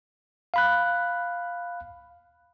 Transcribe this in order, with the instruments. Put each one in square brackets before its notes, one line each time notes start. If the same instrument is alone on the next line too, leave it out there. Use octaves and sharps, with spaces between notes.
[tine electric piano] F5 B5 F#6